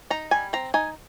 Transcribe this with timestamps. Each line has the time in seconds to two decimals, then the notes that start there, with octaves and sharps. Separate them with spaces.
0.10 D#4 A#5
0.31 G3 G#5
0.53 C4 A#5
0.74 D#4 G#5